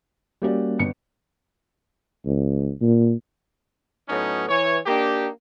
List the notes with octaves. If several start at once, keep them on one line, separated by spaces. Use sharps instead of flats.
G3 A#3 C#4 F#4 G4 D5
G1 B3 C#7
C#2
A#2
A2 F#3 B3 C#4 D#4
E3 C#5
A#3 D4 D#4 G4